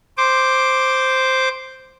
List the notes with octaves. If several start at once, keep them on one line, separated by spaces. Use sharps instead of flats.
C5 D6